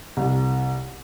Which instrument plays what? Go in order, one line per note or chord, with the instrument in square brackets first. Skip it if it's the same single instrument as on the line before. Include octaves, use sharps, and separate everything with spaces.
[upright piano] C2